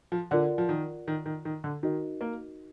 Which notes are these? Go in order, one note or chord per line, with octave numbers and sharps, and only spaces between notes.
F3
D3 F4 A#4 D5 F#5
F3
D#3
D#3
D#3
D#3
D3
D#3 D#4 F#4 A#4 D#5
A#3